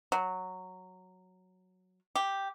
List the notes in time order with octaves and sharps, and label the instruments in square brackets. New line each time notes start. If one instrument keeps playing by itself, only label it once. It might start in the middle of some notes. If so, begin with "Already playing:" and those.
[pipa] F#3
G4